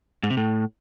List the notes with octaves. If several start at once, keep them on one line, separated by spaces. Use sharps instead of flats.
G#2
C3
A2